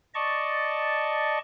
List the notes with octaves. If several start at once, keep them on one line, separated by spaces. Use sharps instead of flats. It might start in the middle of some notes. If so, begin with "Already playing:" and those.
D5 D#5 A5 C#6